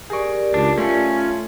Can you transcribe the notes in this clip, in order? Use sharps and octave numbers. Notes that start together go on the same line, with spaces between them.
G4 G#4 A#4 D5 C#6
C#2 D4
A3 C#4 F4